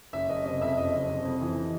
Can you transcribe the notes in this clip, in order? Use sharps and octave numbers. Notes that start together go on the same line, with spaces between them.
F#1 E5
F#1 D#5
C3 D#5
F2 E5
F#1 D#5
F#1
C3
F2
E3